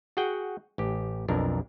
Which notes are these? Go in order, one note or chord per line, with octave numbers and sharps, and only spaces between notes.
F#4 G#4 F#5 G5
A1 G4
B1 F2 D4 A#4